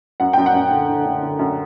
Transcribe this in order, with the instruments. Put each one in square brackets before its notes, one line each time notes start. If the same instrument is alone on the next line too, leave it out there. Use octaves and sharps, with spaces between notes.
[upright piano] F#2 F#5
F#2 G5
F#5
F#2
D3
D3
D3
D3
F#2